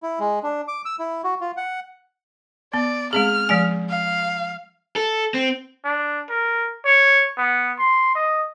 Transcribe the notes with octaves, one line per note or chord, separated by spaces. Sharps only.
E4
G#3
D4
D6
E6
E4
F#4
F4
F#5
B3 D5
G#3 C4 G#4 F6
F3 G#3 G#5
F5
A4
C4
D4
A#4
C#5
B3
C6
D#5